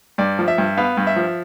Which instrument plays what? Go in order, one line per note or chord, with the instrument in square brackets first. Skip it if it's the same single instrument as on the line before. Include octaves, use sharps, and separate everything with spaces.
[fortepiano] G2 D5
F3
E5
G2
B3 F5
G2
E5
F3